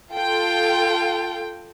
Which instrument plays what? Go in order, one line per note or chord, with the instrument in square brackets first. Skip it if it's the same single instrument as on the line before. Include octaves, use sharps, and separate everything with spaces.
[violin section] F4 A4 G5